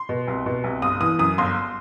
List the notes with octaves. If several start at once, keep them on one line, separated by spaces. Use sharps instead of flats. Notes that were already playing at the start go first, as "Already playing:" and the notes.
Already playing: C6
B2
C2
B2
C2
G1 D#6
E3 D#6
F#2 D#6
G1 C6